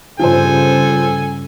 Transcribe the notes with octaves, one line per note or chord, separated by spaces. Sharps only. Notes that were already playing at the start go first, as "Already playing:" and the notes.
G2 C#3 F3 A4 C5 G#5